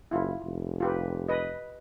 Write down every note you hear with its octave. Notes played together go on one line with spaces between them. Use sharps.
F#1 E4 F4
F1
F4 G4 B4
B4 D#5